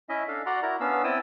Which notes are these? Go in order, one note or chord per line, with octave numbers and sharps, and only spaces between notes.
C#4 E4 D#5 E5
D4 A4 F5
F#4 D5 F#5 A#5 C6
E4 F#4 A#4 A#5
B3 C#4 D4 F5 E6
C4 E4 G5 A5 D#6 E6